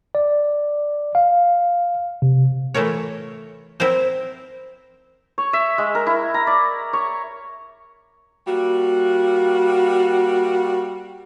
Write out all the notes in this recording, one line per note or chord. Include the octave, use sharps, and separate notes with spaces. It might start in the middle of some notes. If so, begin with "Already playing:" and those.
D5
F5
C3
E3 A3 F4 A#4 C#5
C4 E4 A#4 C5
C#5
E5
G#3
A#4
E4
A#5
D5
C#5
G3 A#3 F#4